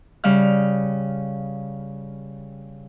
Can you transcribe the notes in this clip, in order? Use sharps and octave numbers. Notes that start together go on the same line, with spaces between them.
C#3 G3 F5 F6